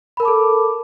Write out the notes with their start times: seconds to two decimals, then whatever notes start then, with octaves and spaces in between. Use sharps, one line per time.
0.17 B5
0.20 A#4
0.23 A5
0.25 D6
0.28 A4